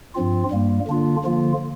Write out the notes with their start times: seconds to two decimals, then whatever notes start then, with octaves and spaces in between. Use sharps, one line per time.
0.15 G2 F3 C4 F4
0.51 G2 G3 A#3
0.87 D3 A#3 D4 F4
1.24 D3 F3 A#3 F4